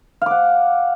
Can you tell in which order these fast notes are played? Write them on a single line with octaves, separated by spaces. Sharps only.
F5 D6 F#5